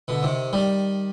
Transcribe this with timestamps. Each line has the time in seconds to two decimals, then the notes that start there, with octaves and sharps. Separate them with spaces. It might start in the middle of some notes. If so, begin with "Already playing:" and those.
0.08 B2 D3
0.23 C3 D#3
0.53 D#3 G3